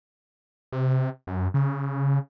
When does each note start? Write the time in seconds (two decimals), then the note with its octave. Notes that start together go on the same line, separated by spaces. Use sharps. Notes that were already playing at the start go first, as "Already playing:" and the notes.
0.72 C3
1.27 F#2
1.54 C#3